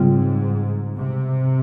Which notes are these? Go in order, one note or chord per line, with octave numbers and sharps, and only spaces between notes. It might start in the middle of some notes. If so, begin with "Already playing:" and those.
Already playing: G#2 C#3 G3 C4 F4
C3